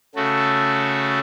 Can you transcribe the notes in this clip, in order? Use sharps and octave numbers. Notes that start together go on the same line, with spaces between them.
C#3 A3 F#4 A4